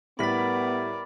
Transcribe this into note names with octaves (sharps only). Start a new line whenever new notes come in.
A2 G3 B3 A#4 D5 B5 A6 B6